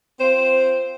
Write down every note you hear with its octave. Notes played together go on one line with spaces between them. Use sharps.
C4 F4 C5